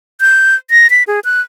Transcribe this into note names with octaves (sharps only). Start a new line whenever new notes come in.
G6
A#6
B6
G#4
F#6